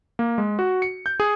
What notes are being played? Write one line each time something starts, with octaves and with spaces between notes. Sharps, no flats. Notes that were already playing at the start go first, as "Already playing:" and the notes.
A#3
G#3
F#4
C#7
G6
G#4